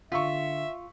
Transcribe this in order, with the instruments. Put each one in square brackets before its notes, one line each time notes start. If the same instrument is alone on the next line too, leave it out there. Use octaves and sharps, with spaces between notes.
[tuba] D3 [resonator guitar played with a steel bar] F4 [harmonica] E5 [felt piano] C#6 E6 B6